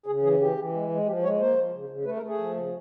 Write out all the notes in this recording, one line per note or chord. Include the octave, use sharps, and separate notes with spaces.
C#3 G#4
E3 G#4
E3 G4
E3
G#3
G#3
F3 G4
G#3 C#5
A#3 C5
F3
C#3
C#3
A3 B4
A#4
A3
G#4
F3
C#3